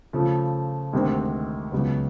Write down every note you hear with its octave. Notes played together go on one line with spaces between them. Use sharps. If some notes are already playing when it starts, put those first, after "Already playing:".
C#3 F3 A3
D2 C3 D#3 G#3 C4
C#2 C#3 F#3 B3